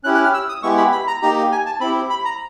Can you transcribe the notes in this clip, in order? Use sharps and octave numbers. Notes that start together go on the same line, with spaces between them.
C#4 E4 G4 F#6
F#6
F6
E6
D#6
G#3 B3 E4 G4 C#6
B5
B5
A#5
A#3 D#4 G4 A#5
G#5
A5
C4 E4 G4 B5
B5
A#5